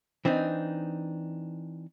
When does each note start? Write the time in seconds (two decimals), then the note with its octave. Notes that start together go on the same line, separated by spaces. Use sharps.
0.25 E3 C4 D4 D#4